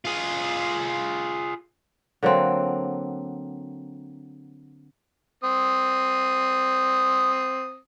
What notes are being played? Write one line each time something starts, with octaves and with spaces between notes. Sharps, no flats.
F4 G#4
D3 F#3 A#3 C4
C4 D#6